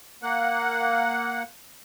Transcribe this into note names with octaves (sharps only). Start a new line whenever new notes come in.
A#3 F#5